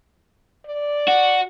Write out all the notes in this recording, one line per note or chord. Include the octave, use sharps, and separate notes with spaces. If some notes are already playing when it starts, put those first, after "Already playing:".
D5
F#4